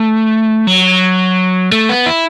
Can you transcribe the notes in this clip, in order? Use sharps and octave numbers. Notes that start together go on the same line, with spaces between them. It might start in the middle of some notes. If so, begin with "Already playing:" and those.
Already playing: A3
F#3
A3
B3
E4